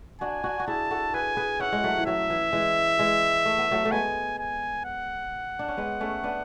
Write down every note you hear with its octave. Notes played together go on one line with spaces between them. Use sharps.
D4 F#4 G#5
D4 F#4
F#4
E4 G#4 A5
F#4 A4
G#4 B4 G#5
G#4 B4
C#4 E4 F#5
G#3
F#3 A3
E3
F#3 E5
E3
E3 G#3
E3 G#3
A3
B3
F#3 A3
A3
G#3 B3 G#5
G#5
F#5
D4
C#4
G#3 B3
A3 C#4
B3 D4